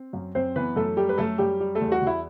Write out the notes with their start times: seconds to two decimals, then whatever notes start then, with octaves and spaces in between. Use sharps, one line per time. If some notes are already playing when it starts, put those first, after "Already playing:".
Already playing: C4
0.13 F#2
0.35 F#2 C4 C5
0.56 E3 B3 B4
0.76 F#2 A3 A4
0.97 G3 A3 G4
1.09 B4
1.18 F#2 A3 A4
1.38 F#2 G3 G4
1.60 G3
1.75 A3 A4
1.81 E2
1.92 F#4
2.02 E2 E4